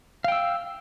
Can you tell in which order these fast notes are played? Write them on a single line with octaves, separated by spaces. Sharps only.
F5 G5 E6